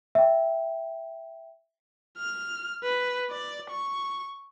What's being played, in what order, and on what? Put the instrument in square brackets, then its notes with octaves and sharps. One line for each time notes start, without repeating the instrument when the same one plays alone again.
[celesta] E5 G5
[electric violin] F6
B4
D5
C#6